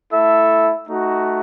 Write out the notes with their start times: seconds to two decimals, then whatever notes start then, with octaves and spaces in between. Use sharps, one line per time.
0.13 A3 E4 A4 E5
0.88 A3 D#4 F#4